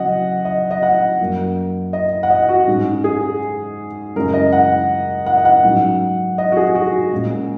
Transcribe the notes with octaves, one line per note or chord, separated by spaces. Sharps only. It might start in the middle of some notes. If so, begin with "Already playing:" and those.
Already playing: C#3 F#3 C#4 D#5 F#5
D#5
D#5
F#5
F#2 F#3 A#3
D#5
F#5
D#5
F#4
G#2 G#3 C#4
G#4
F#2 C#3 G#3 C#4 A#4
D#5
F#5
F#5
D#5
F#5
G#2 F#3 C#4
D#5
F#4
G#4
F#4
A#2 G#3 C#4